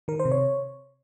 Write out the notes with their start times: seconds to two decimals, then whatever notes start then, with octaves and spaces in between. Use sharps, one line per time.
0.08 D#3 A#4
0.20 C5
0.25 C3
0.32 C#5